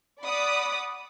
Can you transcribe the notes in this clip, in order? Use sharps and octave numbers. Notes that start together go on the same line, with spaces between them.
D5 F#5 B5 D6 D#6